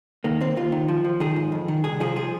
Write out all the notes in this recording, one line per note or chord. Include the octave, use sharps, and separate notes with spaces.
D#3 A#3
D#2 C4
D#2 F4
D#3
F3
F3
D#3 G#4
G#2
F2
D#3
C2 G#4
F3 G#4
F3 G#4